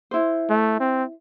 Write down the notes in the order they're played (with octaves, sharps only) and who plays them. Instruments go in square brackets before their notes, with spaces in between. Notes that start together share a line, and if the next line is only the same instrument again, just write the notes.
[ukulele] E4 C5
[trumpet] A3
C4